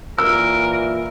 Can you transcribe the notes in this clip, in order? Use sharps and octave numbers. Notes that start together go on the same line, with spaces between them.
A#2 E3 A#4 E6